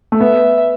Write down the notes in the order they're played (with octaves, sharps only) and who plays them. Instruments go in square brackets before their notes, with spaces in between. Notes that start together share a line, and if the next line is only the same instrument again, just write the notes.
[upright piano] A3
[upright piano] B3 [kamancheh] E5